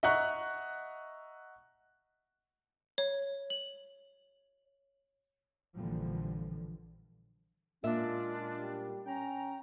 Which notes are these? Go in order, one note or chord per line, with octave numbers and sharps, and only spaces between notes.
D#5 E5 F#5 A#5 C#6 F#6
C#5
F#7
A#1 A#2 D3 E3 F3 G3
A#2 G#3 C#4 D4 F4 E5
G3
C#4 G5 A#5